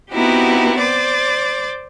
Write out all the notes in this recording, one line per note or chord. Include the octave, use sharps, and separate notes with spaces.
B3 C4 D#4 E4 F#4 G4
C5 D5 D6 A6